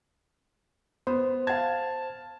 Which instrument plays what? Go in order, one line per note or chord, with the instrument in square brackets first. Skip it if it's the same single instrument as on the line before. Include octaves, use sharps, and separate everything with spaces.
[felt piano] B3 [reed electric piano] C5
[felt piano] F5 G#6 [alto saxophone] A5